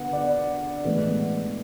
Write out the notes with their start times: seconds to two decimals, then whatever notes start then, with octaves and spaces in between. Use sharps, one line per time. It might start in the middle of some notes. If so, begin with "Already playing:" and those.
Already playing: D3 B3 F#5
0.13 D5
0.84 A2 E3 G#3 B3